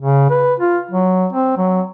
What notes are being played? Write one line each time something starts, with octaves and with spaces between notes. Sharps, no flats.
C#3
B4
F4
F#3
C4
F#3